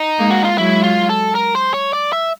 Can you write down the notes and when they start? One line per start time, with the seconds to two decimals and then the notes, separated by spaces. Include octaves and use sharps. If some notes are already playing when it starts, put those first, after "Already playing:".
Already playing: D#4
0.19 G#3 A#3
0.30 F#4
0.44 F4
0.57 F#3 G#3 E4
0.84 F4
1.09 A4
1.35 A#4
1.55 C5
1.74 C#5
1.93 D5
2.13 E5